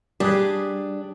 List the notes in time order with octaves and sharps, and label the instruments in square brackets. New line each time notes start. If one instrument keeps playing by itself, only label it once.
[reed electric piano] G3 [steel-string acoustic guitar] D4 [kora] G4 G#4 B4